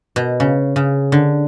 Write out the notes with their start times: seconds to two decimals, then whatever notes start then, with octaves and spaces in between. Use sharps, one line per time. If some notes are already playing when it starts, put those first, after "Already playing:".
0.16 B2
0.40 C#3
0.76 C#3
1.12 D3